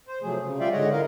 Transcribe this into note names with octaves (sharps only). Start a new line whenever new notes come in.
C5
C3 F3 F#3 A3 G#4
C#3
G3 F4 D5 E5 F5 G5
G#2 D3 G#3 C#5 D#5 F#5
E4 A#4 D#5 F5